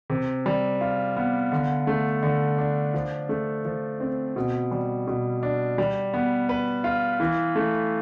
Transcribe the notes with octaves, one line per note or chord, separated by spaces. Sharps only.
C3
G3
F4
B3
D3
A3
D3
D4
F3
A3
F3
C4
B2
G3
B2
D4
G3
B3
B4
F4
E3
A3